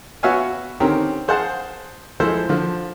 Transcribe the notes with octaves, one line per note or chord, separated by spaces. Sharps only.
B3 F#4 C#5 E5 F5 G#5
D3 D#3 C4 C#4 G4 A#4
G#4 C5 F5 F#5 A5
F3 G#3 E4 A4 C5
D3 F3